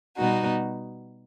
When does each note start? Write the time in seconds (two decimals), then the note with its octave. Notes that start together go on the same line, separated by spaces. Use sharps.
0.17 B2 G3 B3 D#4 F#4